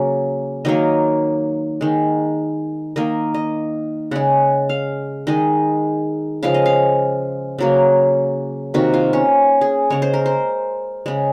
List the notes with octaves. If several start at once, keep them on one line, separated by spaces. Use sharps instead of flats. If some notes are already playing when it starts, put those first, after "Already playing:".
Already playing: C#3 F#3 A#3
D#3 F#3 A#3 D#5
D#3 G#3
D#3 A#3 D#5
D#5
C#3 G#3 F#5
F5
D#3 G#3 D#5
C#3 F3 G#3 F5
D#5
F5
C#3 F#3 A#3
C3 D#3 A#3 F#4
F4
C#4
G#4
C#3 G#3 C#5
C5
A#4
C5
C#3 G#3